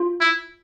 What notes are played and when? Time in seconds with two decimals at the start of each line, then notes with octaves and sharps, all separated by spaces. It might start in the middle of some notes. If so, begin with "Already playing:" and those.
Already playing: F4
0.21 E4